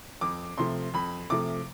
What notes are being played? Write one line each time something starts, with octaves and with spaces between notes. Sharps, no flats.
F2 D6
C3 F3 A3 C6
F2 B5
C3 F3 A3 D6